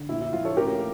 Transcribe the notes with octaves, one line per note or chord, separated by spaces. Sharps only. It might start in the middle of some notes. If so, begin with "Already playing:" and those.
Already playing: D3
A#1 E4
E4
F3 F4
A4 C#5
A1 G4 A#4